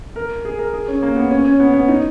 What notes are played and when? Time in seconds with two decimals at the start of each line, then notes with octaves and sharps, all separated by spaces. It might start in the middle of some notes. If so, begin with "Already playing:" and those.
0.16 A#4
0.45 G#4
0.59 A#4
0.73 G#4
0.88 C#4
1.02 A#3
1.16 B3
1.31 C#4
1.45 C#4
1.60 B3
1.74 B3
1.88 D#4